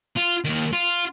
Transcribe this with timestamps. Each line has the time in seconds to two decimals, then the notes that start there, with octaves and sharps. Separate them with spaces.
0.17 F4
0.45 D#2 D#3
0.73 F4